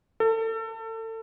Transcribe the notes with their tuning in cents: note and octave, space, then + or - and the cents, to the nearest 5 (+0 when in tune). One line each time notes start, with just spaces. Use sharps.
A4 +30